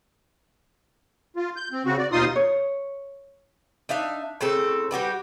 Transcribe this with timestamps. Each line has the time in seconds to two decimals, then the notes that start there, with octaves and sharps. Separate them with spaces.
1.36 F4
1.56 G6
1.72 C4
1.85 C#3 C4 F#4
1.98 D5
2.12 D#2 B2 D#4 F4 C6 D#6
2.36 C#5
3.89 D4 D#4 E5 F5
4.41 A2 C#3 C4 A4
4.91 G3 F#4 G4 B4